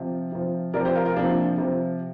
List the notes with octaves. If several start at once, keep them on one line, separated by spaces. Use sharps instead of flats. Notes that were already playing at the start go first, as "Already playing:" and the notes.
Already playing: C3 F3
C3 F3
C3 F3 A#4 D5
G4 C5
F4 A#4
F4 A#4
C3 F3 A#3 D4
C3 F3